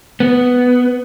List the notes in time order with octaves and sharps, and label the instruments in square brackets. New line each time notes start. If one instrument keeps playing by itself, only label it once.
[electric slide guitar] B3